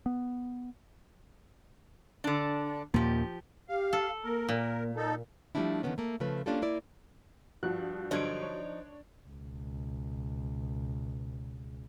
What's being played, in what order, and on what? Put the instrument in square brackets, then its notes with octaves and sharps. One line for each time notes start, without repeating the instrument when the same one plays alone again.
[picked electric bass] B3
[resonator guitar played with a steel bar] D3 D4
[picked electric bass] D#2 A#2 A#3 [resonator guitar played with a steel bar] F3 G4
[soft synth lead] G4 [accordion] F5
[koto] A4
[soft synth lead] A#3 [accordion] A#4
[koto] A#2
[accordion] D#4 A4
[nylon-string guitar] F3 G3 A3 C#4 D4 E4
D3 D#3 F3 A3 B3 C#4
A3 A#3
C#3 F3 A3 B4
A#3 C#4 D4 F4 G4 A4
A#3 E4 D5
[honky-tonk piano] G2 F3 [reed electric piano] F#4 [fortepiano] F#6
[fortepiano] G2 D3 F#3 [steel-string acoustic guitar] F3 D#4 [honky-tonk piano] D4 G#6 D7
[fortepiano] C#5
[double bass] C#2 B2